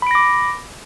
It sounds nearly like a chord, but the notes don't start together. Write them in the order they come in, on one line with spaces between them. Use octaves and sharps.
B5 D7 A#6 D6